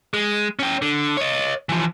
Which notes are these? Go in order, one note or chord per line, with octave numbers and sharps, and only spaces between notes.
G#3
C#4 G5
D3
C#5 D#5
E3 F3